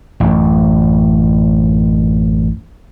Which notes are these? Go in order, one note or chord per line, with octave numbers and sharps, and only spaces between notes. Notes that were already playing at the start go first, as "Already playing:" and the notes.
A1 F#2